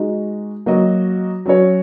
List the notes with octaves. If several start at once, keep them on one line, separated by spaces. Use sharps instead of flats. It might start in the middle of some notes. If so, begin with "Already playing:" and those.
Already playing: G#3 D#4 F#4
F#3 A#3 F#4 D#5
F#3 C#4 F#4 C#5